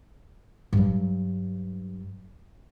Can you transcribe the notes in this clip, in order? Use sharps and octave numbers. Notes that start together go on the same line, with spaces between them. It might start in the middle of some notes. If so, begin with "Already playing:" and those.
G2 F#3